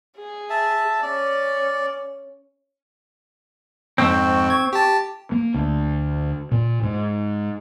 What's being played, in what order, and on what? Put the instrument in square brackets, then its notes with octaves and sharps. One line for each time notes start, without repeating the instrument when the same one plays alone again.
[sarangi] G#4
[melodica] E5 A5
[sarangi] C#4 [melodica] D5
[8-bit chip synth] F2 G#2 [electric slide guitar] C4 [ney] C#6
[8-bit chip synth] G#6
G4 A5
[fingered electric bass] A#3
D2
A#2
G#2